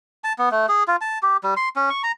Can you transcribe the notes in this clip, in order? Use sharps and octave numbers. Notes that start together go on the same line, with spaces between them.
A5
B3
A3
G#4
F4
A5
G4
G3
C6
C#4
C#6
A#5